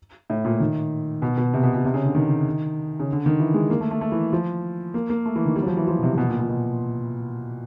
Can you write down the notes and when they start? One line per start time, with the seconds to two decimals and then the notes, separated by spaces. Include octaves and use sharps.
0.30 A2
0.45 A#2
0.60 D#3
1.22 B2
1.37 B2
1.54 C3
1.63 B2
1.74 B2
1.85 C3
1.94 C#3
2.05 D3
2.15 D#3
3.00 C#3
3.13 D3
3.26 D#3
3.40 E3
3.54 G#3
3.70 A#3
3.80 A3
3.91 A3
4.01 A3
4.12 E3
4.33 F3
4.94 A#3
5.10 A#3
5.25 A3
5.35 E3
5.45 D#3
5.56 G3
5.62 F#3
5.66 F3
5.77 E3
5.88 F3
5.99 B2
6.03 C3
6.14 C3
6.18 B2
6.28 A#2
6.39 A#2
6.49 B2